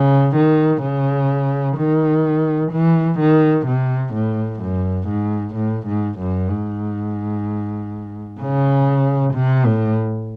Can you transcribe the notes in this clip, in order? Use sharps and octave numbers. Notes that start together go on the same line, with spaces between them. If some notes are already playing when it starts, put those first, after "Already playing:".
Already playing: C#3
D#3
C#3
D#3
E3
D#3
C3
A2
F#2
G#2
A2
G#2
F#2
G#2
C#3
C3
A2